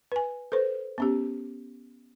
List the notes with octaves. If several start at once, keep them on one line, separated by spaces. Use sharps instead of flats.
B4 G#5
A4 B4 C5
B3 C#4 G4